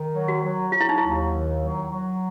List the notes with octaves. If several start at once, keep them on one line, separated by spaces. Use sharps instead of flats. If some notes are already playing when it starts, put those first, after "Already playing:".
Already playing: D#3
F#3
F#4
F#3
F#3 F4
E4
D#4
D#2 E4
D#3
F#3
F#3